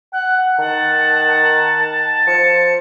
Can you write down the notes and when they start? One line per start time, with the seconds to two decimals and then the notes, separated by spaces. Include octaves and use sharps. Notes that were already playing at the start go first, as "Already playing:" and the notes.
0.13 F#5 F#6
0.59 D#3 F#5 A5
2.27 F3 C#7